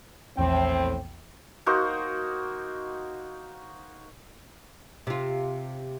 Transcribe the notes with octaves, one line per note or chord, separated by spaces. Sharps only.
A#1 E2 A2 C4 G5
A#3 D#4 F#4 C5
C3 F4